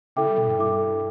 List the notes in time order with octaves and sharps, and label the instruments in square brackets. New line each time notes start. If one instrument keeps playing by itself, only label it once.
[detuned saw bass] C#3 [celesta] E4 A4 E5 G5 D6
[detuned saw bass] G3
B2
G2
[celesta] E4 A4 E5 G5 D6